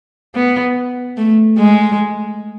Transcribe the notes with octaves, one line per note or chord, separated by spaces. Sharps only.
B3
A3
G#3